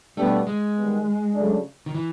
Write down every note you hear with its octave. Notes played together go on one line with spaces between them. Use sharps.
B2 G3 A3 B3 D4 G4
G#3
D#3 G3 B3
C#3 F#3 A3 D4
D#3
E3